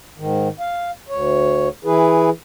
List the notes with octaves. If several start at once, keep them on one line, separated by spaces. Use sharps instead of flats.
G#2 D#3
F5
D2 C#5
E3 E4 G#4 B4